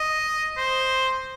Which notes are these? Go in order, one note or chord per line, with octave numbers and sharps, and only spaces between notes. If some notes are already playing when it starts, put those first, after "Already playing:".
Already playing: D#5
C5